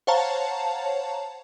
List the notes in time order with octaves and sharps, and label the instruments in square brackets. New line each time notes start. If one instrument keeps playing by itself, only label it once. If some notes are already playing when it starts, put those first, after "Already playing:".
[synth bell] C5 C#5 F5 F#5 A5 A#5